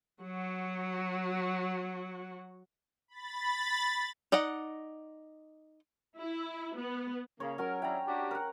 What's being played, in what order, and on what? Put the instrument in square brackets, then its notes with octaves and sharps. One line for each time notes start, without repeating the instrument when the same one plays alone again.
[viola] F#3 F#4
[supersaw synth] B5 A6
[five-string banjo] D#4 D5 D#5 F#5
[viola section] E4
B3
[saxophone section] C#3 A#3 [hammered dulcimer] C#5
[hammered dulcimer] F#3 C#4 [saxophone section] A#4
[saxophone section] C#4 D4 E4 [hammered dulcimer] G5 A#5
[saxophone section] D4 F#4 G4
[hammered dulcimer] A#4 F#5